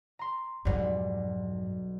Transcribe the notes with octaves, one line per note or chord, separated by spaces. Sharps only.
A#5 C6
B1 F2 G#2 F#3 G3